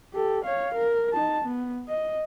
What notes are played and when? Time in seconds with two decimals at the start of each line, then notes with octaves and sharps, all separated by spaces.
0.13 G4 A4
0.45 C#5 F5
0.75 A#4
1.13 D#4 A5
1.45 B3
1.88 D#5